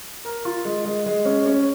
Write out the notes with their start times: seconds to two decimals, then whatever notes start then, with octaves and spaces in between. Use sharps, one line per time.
0.25 A#4
0.45 F4
0.65 G#3
0.85 G#3
1.06 G#3
1.25 C#4
1.46 C#4